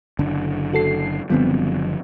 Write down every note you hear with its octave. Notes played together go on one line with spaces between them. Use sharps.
F#1 D3 D4
F#4 A4 C7
F#1 D3 F3 G3 B3 C4